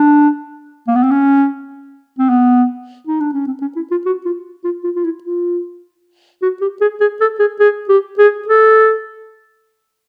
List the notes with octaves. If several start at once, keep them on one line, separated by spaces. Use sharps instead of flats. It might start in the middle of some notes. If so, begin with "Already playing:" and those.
Already playing: D4
A#3
B3
C4
C#4
C4
B3
D#4
D4
C#4
C4
C#4
E4
F4
F#4
F4
F4
F4
F4
E4
F4
F#4
G4
G#4
G#4
A4
G#4
G#4
G4
G#4
A4